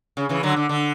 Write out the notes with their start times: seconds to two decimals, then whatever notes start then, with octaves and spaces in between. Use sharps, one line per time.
0.17 C#3
0.29 C#3 E3
0.43 D3 F#3
0.56 D3
0.69 D3